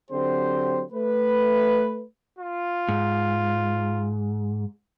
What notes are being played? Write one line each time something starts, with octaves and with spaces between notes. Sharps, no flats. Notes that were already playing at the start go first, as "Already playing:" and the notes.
D3 F#3 C4 G4 C5
A3 B4
F4
G#2